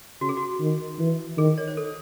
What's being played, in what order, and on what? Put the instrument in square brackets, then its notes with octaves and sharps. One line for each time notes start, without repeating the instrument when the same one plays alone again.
[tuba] C#3 [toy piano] F#4
[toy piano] G#4
F#4
[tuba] D#3
E3
[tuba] D#3 [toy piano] G#4
[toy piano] C#5
C5
A4